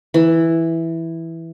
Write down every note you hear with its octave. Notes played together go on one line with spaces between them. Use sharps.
E3